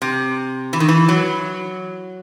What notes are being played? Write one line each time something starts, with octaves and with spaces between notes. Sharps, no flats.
C3
E3
D#3
E3
F#3